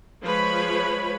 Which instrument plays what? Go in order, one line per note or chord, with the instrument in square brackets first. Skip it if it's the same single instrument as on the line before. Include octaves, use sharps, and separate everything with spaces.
[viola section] F3 G#3 B4 C#5 B5